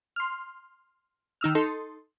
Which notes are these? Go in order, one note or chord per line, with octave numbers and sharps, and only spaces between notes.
C6 F6
D#3 D#4 E6 F6
D#4 A4 C6